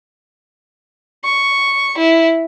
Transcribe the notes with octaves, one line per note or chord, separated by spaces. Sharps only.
C#6
E4